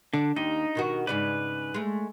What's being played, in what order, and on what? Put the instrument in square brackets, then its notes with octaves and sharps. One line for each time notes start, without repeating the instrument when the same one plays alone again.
[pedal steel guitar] D3 [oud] D4
[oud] D#2 [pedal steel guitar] D#4 D#5
[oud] B2 D#3 F#4
[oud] G#2 C#3 D5 [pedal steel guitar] B4
[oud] G#3 A3